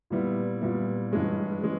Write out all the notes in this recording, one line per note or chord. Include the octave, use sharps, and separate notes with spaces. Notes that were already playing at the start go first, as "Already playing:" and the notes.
A#2 G3 B3 E4
A#2 G3 B3 E4
G2 E3 G#3 C#4
E3 G#3 C#4